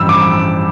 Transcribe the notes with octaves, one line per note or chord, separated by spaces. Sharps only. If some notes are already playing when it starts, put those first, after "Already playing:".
Already playing: A1 G2 F3 E6
D6